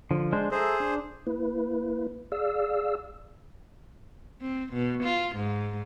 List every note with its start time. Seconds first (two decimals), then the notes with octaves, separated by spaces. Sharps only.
0.11 D3 F3
0.32 G#3 D4 C5
0.52 G#4 A4 C5 E5 A#5
0.80 D4
1.27 A#3 E4 B4
2.32 G#4 D5 F5 E6
4.41 C4
4.73 B2
5.03 F4
5.36 G#2